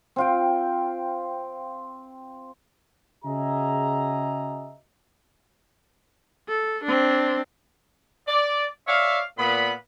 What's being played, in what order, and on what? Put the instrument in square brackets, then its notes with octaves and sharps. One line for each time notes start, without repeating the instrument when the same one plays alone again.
[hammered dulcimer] C4 F4 G5
[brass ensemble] C#3 F#4 G#4 D#5 E5 A#5
[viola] A4
C4 D4
[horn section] D5
C#5 D5 E5 F5
A#2 B3 B5